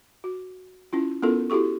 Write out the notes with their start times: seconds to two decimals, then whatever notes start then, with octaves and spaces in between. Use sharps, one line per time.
0.24 F#4
0.93 C#4 E4 F4
1.22 B3 C#4 E4 F4 A4 A#4
1.50 E4 F#4 G4 A4 C#6